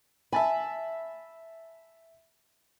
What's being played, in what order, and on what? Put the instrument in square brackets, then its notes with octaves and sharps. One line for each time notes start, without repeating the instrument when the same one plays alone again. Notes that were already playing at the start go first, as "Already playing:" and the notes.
[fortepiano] E5 A5 B5 [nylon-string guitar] G#5